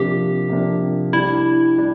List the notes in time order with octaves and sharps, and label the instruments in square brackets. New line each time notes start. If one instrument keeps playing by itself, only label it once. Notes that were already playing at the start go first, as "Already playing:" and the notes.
Already playing: [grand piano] C3 F3 A#3 D4 [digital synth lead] G4
[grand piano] C3 F3 A#3 D4
[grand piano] G3 D4 G4 [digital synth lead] E4
[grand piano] G3 D4